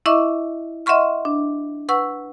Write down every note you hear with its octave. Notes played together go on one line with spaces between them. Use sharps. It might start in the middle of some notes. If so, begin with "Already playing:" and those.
E4 D#5 E5 C#6 D6
D#5 E5 F#5 C6 C#6 F6
D4
B4 F#5 C#6 E6